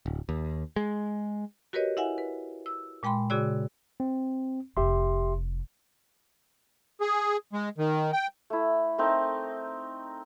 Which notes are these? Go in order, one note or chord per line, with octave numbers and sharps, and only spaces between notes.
D1
D#2
G#3
F#4 G4 A#4 B4 C#5 D#5
E4 E5 F#5 G#5
B4
E6
A#2 G#3 G5 B5 C6
A#2 C#3 F#4 G#4 D5 E6
C4
F1 G4 E5 C6
G#4
G#3
D#3
G5
A3 E4
A3 C4 D#4 A#4